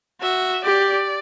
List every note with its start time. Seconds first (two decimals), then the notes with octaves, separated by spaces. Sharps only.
0.22 F#4 E5
0.64 G4 D5